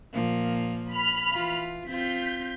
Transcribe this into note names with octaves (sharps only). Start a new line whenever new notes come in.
A#2 F3 A#3
B5 F6
E3 F4
C4 F4 G6 B6